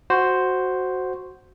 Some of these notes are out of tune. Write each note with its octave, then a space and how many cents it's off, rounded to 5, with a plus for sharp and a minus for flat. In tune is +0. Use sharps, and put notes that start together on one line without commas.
F#4 +0 C5 +0